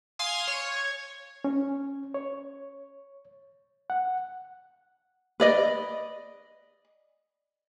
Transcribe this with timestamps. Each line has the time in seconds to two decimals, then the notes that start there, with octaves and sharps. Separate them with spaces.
0.19 F5 G#5 C6 D#6
0.48 C#5
1.44 C#4
2.14 C#5
3.90 F#5
5.40 B4 D5 D#5